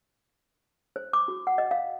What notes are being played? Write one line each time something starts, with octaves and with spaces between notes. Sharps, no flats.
C5
D6
F#4
F#5
D#5
F5